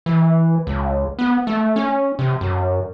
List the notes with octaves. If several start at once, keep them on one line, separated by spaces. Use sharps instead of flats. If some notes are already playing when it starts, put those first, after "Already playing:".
E3
C#2
B3
A3
C#4
C3
F#2